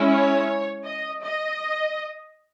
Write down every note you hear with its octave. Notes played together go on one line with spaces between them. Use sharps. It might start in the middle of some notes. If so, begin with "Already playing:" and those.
Already playing: G#3 C#4 E4
C#5
D#5
D#5